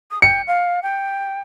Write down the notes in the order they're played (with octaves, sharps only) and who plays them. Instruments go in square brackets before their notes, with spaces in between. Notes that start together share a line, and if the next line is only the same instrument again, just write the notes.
[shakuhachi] D#6
[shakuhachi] G5 [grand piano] C#7
[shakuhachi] F5
G5